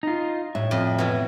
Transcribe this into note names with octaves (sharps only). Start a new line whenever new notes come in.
D#4 F4
A2 E5
F2
B2 E3